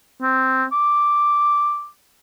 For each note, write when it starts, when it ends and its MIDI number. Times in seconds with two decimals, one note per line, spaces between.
0.22 0.64 60
0.72 1.88 86